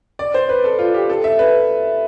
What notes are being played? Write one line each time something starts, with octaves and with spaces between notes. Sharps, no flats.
D5
C5
B4
A4
F4
G4
A4
E5
B4